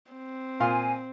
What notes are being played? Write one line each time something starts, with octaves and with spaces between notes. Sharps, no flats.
C4
A#2 F5 G#5 C6